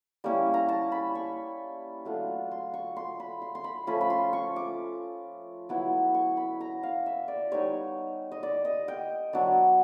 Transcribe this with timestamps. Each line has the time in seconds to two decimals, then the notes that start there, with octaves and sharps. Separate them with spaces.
0.24 G3 A#3 C#4 E4
0.54 A#5
0.69 A5
0.92 B5
1.15 C#6
2.05 F#3 A3 D4 F4
2.51 C6
2.74 C#6
2.96 C6
3.20 B5
3.42 C6
3.55 C6
3.64 B5
3.87 F3 A3 C#4 F4 B5
4.01 B5
4.10 C6
4.33 C#6
4.56 D6
5.69 F#3 B3 E4
6.14 C#6
6.37 B5
6.61 A#5
6.83 F5
7.06 E5
7.28 D5
7.51 G3 B3 D#4 C#5
8.32 D#5
8.43 D5
8.65 D#5
8.88 G5
9.33 F#3 B3 D4